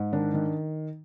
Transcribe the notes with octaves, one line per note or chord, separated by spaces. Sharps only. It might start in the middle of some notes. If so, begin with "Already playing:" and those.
Already playing: G#2
D#3 D4
D#3